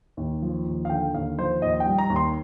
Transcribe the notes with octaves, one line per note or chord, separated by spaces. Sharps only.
D#2
F3
D#2
F5
D3 G5
D#2 F5
F3 C5
D#2 D#5
G5
G3
A#5
D#2
C6